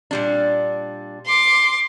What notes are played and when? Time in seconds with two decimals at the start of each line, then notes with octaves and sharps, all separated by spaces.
0.11 A#2 G3 D4
1.26 C6 D6